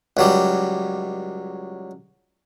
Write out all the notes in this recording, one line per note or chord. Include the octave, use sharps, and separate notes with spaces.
C#2 F#3 G3